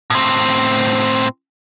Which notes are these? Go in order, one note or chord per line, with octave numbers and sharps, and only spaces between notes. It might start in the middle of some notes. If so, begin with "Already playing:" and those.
A2 C4